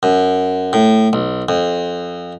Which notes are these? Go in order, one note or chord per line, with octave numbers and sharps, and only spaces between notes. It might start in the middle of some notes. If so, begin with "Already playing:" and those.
F#2
A2
B1
F2